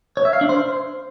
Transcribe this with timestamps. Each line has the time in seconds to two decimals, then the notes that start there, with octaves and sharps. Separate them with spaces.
0.17 C#5
0.25 E5
0.33 F5
0.41 D4
0.49 C5